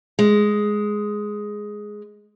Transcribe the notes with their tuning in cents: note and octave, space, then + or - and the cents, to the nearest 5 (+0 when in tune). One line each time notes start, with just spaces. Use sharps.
G#3 +5